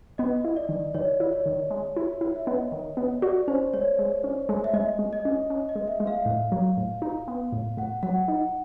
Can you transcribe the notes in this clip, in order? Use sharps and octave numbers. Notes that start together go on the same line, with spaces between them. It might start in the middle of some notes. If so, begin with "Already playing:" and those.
B3 D#5
E4
D5
D#3
D#3 C#5
E4
C#5
D#3
G#3
E4
E4
E5
B3 D#5
D#3
B3
F#4 D5
C#4 C5
G#3 C#5
G#3
C#4
G#3
E5
G#3 D#5
G#3
D#5
C#4
C#4
D#5
G#3
E5
G#3
F5
A2
F#3
A2
D#4
B3
A2
A2 F#5
F#3 F#5
D#4